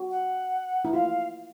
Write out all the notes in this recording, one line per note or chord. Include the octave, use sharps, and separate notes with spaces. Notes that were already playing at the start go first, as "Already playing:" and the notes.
Already playing: F#4
F#5
E4
F4 F5